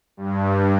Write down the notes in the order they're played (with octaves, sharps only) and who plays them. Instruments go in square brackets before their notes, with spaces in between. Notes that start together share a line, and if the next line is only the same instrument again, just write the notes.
[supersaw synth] G2